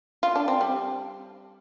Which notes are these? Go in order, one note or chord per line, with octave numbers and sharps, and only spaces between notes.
F4
D4
C4
G3